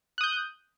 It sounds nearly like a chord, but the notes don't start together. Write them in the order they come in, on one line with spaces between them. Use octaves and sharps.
F#6 D#6 G6